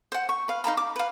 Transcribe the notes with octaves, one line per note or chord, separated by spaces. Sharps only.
C5 F#5
C#6
B4 F5
D#4 F5 A#5 B5
D6
B4 F5